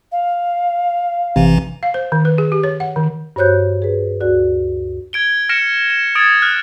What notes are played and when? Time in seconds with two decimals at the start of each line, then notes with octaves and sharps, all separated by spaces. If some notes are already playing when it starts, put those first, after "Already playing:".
0.11 F5
1.36 A1 C3 E3
1.83 F5
1.94 C5
2.12 D#3
2.25 B4
2.38 G#4
2.52 G4
2.63 C#5
2.80 F#5
2.96 D#3
3.36 G2 F#4 C5 C#5 F#6 G6
3.82 G#4 B4
4.21 D2 F#4 D5 F#6
5.13 G#6 D7 G7
5.49 F6 A#6 C#7 D7 E7
5.90 E7
6.15 D#6 G#6 A6 D7
6.42 F6 F#6